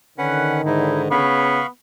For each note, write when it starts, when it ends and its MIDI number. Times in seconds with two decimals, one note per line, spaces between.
0.18 1.22 50
0.18 1.22 51
0.18 0.62 61
0.18 0.62 71
0.18 0.62 78
0.65 1.07 44
0.65 1.02 63
0.65 1.02 64
1.11 1.60 49
1.11 1.66 59
1.11 1.67 77
1.11 1.67 83
1.11 1.67 85